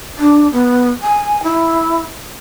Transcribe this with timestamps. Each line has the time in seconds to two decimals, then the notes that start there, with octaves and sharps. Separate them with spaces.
0.18 D4
0.52 B3
1.02 G#5
1.43 E4